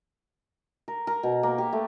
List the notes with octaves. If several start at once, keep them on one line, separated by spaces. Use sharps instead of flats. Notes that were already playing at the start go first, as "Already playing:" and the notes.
A#4
A#4
B2
A#3
G4
A3